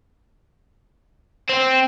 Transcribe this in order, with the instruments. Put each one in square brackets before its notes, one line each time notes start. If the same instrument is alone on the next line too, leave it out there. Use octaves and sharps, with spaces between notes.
[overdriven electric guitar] C4